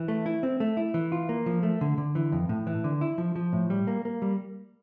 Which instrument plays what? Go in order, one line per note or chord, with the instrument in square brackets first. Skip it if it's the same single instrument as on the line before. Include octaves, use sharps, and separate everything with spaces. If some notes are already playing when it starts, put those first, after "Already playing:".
Already playing: [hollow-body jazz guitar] E3
A3
E4
C4
A3
E4
E3
F4
A#3
F3
A3
D3
D3
E3
F2
A2
E3
D3
E4
F3
F3
A2
G3
A#3
A#3
G3